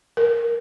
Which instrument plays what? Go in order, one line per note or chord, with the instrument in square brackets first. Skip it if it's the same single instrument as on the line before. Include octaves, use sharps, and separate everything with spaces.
[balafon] A#4